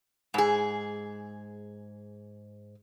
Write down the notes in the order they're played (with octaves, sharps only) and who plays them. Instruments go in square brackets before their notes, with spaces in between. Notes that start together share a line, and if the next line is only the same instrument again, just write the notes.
[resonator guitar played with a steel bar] G#2 G#4